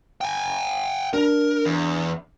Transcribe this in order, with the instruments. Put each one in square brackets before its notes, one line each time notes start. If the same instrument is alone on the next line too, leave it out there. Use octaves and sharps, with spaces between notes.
[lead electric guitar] G5 G#5
[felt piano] D4 [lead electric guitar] A#4
[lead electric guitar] E2